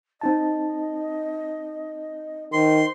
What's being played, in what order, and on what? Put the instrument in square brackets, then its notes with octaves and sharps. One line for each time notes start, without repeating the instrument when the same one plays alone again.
[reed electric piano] C4 D#4 A5 [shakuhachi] D#5
[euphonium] D#3 [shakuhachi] C5 [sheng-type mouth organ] C6